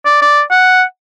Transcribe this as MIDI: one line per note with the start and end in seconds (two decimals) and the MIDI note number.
0.05 0.20 74
0.22 0.42 74
0.51 0.83 78